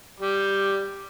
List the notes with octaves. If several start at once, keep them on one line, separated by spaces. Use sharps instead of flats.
G3